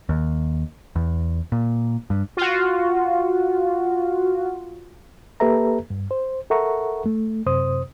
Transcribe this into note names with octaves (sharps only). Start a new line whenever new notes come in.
D#2
E2
A#2
G2
F4 F#4
A#3 G4 A4 B4 E5 A#5
G2
C5
A4 A#4 E5 F#5 A#5 C#6
A3
F#2 C3 C5 D#6